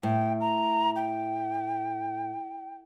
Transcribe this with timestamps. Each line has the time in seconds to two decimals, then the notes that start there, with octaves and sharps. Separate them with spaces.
0.03 A2 G5
0.41 A#5
0.96 G5